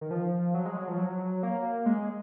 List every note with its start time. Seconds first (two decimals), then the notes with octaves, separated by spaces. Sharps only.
0.01 D#3
0.11 F3
0.54 F#3
0.65 G#3
0.77 F#3
0.88 F3
0.98 F#3
1.43 A#3
1.86 G#3